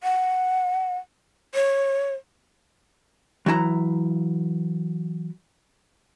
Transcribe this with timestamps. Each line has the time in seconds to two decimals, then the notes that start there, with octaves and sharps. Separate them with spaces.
0.04 F#5
1.55 C#5
3.46 E3 F#3 E4 A#5